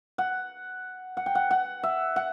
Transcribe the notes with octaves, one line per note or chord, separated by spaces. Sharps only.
F#5
F#5
G5
F#5
F#5
E5
F#5